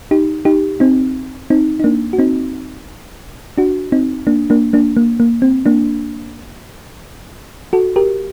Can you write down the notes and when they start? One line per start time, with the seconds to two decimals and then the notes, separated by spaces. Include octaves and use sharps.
0.11 D#4 G4
0.45 D#4 G4
0.80 C4 D#4
1.50 C4 D#4
1.80 D#4
1.84 A#3 D4
2.13 F#4
2.19 C4 D#4
3.58 D4 F#4
3.92 C4 D#4
4.27 A#3 D4
4.50 A#3 D4
4.73 A#3 D4
4.97 A#3
5.20 A#3
5.42 C4
5.66 A#3 D4
7.73 F#4 A4
7.96 G4 A#4